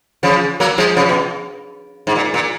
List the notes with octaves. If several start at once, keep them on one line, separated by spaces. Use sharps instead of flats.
C#3 F3
F#3 A#3
F3 G#3
C#3 F3
B2
G#2
A#2
A#2